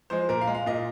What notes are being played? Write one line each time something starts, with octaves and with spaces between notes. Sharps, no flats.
F3 G#3 C5
A#2 A#4
F5
G#3
F5
A#2 D#5